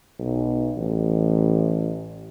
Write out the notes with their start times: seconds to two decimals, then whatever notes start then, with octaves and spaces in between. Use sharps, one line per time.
0.19 B1
0.77 A1